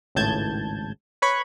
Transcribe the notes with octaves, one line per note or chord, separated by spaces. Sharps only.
G#1 C#2 A2 A5 G6 G#6
B4 C#5 B5 C#6